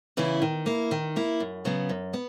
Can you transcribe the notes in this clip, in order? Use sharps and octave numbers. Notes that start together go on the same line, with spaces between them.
C#3 E3 B3 E4
D#3
A#3 E4
D#3
A#3 E4
F#2
C#3 F#3 B3
F#2
B3